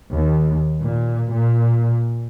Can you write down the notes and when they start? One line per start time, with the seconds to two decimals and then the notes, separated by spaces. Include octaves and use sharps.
0.13 D#2
0.82 A#2
1.31 A#2